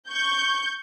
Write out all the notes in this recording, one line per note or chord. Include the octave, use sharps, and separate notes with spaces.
C#6 G6